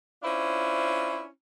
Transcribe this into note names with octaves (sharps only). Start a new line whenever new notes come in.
C#4 D4 E4 F4 C5